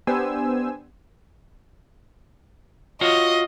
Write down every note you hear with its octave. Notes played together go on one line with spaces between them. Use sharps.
B3 D4 G4 C5 G#5 E6
F4 F#4 C#5 D#5